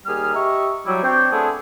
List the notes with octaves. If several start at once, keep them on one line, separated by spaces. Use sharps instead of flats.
D#2 G3 G#4 F6
G4 D#5 E5 A#5 C#6
F#3 G3 E4
C4 D4 C#5 G5
A3 B3 C4 D4 E4 G#4